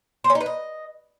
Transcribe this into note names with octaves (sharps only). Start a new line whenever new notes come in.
C5
C#4
D#4
B4
D#5